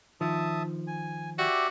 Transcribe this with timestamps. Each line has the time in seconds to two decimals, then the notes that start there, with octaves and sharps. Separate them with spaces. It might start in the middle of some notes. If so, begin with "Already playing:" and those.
0.21 D#3 F3 E5 A5 D#6
0.87 G#5
1.38 F#4 G4 D5 E5